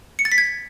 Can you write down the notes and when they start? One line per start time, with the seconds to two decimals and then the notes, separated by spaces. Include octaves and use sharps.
0.19 C#7
0.25 A6
0.32 B6
0.38 G#6